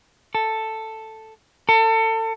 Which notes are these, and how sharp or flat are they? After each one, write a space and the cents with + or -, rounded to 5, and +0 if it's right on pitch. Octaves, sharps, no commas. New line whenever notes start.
A4 +5
A4 +30